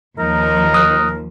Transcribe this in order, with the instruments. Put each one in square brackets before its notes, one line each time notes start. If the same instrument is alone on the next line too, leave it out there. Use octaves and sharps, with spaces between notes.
[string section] D#2 F3 [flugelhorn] D#4 [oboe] A#4
[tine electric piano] D#6 F#6